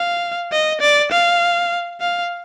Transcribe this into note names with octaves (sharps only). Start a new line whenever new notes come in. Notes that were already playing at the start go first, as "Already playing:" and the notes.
Already playing: F5
D#5
D5
F5
F5